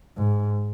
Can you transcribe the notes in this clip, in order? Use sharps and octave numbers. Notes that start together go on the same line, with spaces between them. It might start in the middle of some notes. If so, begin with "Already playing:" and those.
G#2